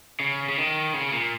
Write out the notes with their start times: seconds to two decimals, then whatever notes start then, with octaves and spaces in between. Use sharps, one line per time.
0.20 C#3
0.49 C#3
0.57 D#3
0.94 C#3
1.13 A#2